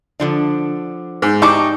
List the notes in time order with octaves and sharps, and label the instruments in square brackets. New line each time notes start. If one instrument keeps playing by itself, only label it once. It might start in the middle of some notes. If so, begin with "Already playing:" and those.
[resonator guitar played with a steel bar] D3 F3 D4
[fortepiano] G#2
[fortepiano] D#4 C#6 D6 [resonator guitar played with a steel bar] G4 D5 A5